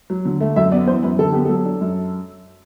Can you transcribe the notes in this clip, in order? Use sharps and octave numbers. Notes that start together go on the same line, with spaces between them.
F#3
D3
A3
F#2 E5
B3 D5
E3 C5
F#2 B4
D3 A4
B3 G4
F#3 A4
D4
F#2